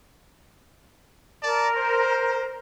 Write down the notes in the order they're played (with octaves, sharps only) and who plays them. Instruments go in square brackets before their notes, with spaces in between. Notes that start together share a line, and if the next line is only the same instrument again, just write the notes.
[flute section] A#4 [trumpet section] D5 A5
[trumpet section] C5